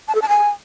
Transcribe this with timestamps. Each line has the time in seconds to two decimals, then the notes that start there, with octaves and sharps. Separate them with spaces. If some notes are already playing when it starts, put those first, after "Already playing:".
0.08 A5
0.15 A4
0.22 A5
0.29 G#5